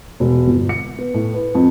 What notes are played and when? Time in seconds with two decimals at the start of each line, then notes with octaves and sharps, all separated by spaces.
0.20 E1
0.48 G1
0.69 C#7
0.99 B3
1.14 A2
1.34 B4
1.55 F2